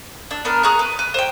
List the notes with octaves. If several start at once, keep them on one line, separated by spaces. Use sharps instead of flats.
D4 E6
B3 D4 A#4
G#4 A#5 C#6 F#6
B4
B4
C5 G5